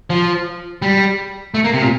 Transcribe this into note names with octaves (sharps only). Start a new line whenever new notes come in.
F3
G3
A3
A#3
C3
A#2